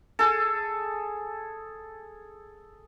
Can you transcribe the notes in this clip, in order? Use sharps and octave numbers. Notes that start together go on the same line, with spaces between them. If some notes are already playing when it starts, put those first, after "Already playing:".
G#4 A4